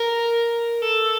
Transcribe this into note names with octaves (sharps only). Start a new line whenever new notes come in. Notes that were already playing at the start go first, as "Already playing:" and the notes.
Already playing: A#4
A4